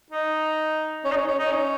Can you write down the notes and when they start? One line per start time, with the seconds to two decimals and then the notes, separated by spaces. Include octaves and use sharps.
0.10 D#4
1.04 C#4
1.11 D#4
1.16 C#4
1.28 C#4
1.39 D#4
1.52 C#4